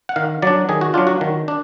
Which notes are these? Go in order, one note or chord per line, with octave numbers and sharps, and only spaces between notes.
F#5
D#3 F5
F#3 D4 D5
D#3 G#4
F#4
F#3 D4 F4
F#4
D#3
D4